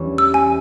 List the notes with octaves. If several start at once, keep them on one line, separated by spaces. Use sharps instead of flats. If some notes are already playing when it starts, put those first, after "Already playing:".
Already playing: E2 G3 C#4 E4
E6
G#5